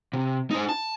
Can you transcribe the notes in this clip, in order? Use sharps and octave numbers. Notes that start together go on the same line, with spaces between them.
C3
D#4 C5
A5